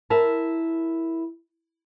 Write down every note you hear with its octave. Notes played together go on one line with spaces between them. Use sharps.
E4 A#4 A5